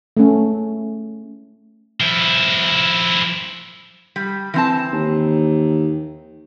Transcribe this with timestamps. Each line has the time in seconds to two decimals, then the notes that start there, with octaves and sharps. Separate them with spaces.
0.17 A3 C#4
2.00 F3 E4
4.16 G3
4.54 E3 C4 A5
4.92 D#2